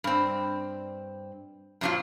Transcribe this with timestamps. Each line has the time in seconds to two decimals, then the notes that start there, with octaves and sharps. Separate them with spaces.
0.04 G2 C4
1.81 F#2 A#2 F3 F#3 C4 F4